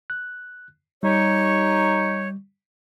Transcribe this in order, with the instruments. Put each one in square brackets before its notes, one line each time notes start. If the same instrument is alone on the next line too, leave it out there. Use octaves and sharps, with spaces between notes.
[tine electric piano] F#6
[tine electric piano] G3 [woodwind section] D#4 G4 C#5